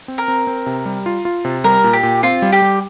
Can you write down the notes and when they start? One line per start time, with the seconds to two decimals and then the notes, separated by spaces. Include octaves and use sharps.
0.08 C4
0.18 A#4
0.28 C4
0.47 C4
0.66 C3
0.86 G3
1.06 F4
1.25 F4
1.45 C3
1.64 G3 A#4
1.84 A#2
1.93 G4
2.03 A#2
2.23 C4 F4
2.42 G3
2.52 G4
2.62 G3